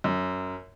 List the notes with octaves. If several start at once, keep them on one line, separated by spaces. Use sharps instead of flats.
F#2